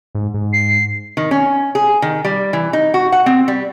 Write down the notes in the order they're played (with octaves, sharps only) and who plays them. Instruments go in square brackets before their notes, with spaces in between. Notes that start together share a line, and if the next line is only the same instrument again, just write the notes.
[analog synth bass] G#2
G#2
[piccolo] C7
[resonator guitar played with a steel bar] D#3
C#4
G#4
D#3
G3
E3
D#4
F#4
F#5
C4
G3